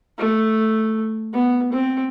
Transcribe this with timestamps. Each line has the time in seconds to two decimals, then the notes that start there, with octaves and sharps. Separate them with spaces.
0.18 A3
1.34 B3
1.72 C4